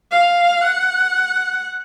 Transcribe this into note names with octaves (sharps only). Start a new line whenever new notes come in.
F5
F#5